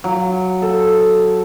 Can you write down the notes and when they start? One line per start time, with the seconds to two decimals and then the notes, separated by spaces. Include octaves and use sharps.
0.04 F#3
0.62 A4